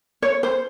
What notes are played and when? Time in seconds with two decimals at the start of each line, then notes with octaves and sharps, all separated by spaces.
0.22 C#5
0.43 C5